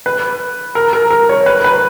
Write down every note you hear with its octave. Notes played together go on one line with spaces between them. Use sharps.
B4
A#4
A#4
A#4
C#5
B4
B4